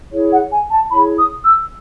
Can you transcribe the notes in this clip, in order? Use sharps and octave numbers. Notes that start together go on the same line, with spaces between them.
E4 G#4 C#5
F#5
G#5
A5
E4 G#4 C#5 B5
D#6
E6